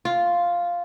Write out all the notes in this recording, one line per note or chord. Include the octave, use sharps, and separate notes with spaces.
F4